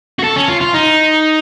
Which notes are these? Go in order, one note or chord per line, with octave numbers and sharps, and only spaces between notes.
F#4
A4
C#4
F4
F4
D#4